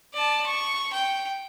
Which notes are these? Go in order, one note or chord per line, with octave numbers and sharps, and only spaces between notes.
D5 A5
C#6
G5